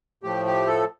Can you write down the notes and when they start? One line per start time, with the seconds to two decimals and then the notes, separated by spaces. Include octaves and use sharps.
0.23 A2 F3 A3 G4
0.45 G4
0.67 A4